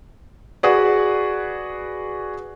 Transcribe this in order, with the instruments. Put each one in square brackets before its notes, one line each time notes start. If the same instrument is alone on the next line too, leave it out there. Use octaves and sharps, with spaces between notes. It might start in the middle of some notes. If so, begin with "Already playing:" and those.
[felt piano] F#4 G#4 B4 D5